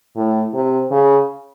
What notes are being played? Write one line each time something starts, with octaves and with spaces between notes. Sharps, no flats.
A2
C3
C#3